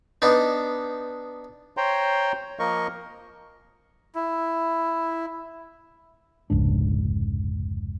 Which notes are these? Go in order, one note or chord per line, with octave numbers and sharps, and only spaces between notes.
B3 D4 D#4
C5 C#5 G5 A#5 C6
F3 A#3 A#4 D#5 C#6
E4
F1 C#2 G#2 D4